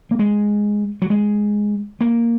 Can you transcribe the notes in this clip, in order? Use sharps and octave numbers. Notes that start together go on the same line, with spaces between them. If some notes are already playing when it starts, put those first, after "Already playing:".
A#3
G#3
F#3
G#3
A#3